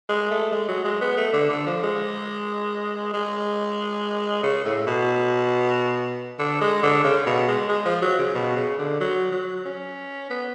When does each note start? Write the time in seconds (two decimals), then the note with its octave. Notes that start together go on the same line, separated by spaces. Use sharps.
0.09 G#3
0.31 A3
0.52 G#3
0.68 F#3
0.84 G#3
1.01 B3
1.17 A3
1.33 D3
1.50 D3
1.66 F3
1.82 G#3
3.14 G#3
4.43 C#3
4.65 A2
4.87 B2
6.39 D3
6.61 G#3
6.83 D3
7.04 C#3
7.26 B2
7.48 G#3
7.69 G#3
7.85 F3
8.02 F#3
8.19 C#3
8.35 B2
8.56 C#3
8.78 D3
9.00 F#3
9.32 F#3
9.65 C#4
10.30 B3